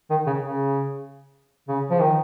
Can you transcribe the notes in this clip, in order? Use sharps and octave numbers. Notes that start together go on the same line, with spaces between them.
D#3
C#3
C#3
C#3
F3
D#3